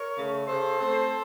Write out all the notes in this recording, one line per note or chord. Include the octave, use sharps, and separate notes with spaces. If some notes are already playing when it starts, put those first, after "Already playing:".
Already playing: A#4 C#5
C#3 A3
C#3 A4 C5
A3 C4